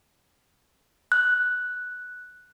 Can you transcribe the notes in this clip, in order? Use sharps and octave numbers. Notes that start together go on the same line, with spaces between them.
F#6